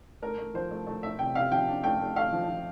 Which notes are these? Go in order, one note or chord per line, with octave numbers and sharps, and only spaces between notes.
A3 A#4
A3
F3 C5
A3
A3
A3 E5
C3 G5
C3 F5
F3 G5
D4
A3 G5
A3
A3 F5
F3
F3